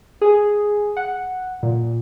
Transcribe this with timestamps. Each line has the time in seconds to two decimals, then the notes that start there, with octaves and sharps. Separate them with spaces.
0.21 G#4
0.97 F#5
1.63 A#2